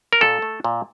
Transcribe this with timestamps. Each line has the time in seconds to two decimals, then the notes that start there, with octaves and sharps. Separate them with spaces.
0.13 A#4
0.21 A#2 A4
0.42 A3
0.64 A#2